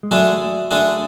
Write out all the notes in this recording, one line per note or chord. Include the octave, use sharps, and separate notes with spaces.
G#3
D3 F#3 A3 D4 G#4
D3 A3 D4 G#4